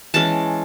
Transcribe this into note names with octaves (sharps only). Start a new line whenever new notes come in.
E3 G#3 C#4 A5